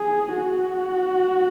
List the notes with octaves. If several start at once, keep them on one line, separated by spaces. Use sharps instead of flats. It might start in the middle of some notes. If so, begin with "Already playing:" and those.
Already playing: G#4
F#4